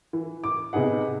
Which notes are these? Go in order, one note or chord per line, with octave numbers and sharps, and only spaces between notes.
E3
D6
C3 B3 D#4 G#4 F#5